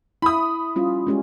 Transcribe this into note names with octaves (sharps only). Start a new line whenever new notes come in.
E4 B5 D#6
G3 C#4 F4
G#3 C#4 G4